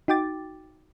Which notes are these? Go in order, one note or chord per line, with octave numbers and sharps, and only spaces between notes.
D#4 F#4 G5 D6 A6